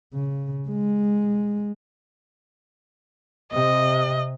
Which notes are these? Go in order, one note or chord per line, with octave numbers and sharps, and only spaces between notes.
C#3
G#3
C3 D#5